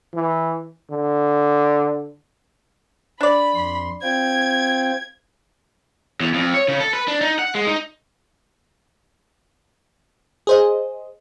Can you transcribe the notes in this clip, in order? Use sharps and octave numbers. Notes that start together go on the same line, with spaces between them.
E3
D3
D4 D5 B5
F2 C6
C4 F4 G5 G#6
E2
F2
C#5
C#3
A4
B4
D4
D#4
F#5
G#3
D#4
G#4 C5 D#5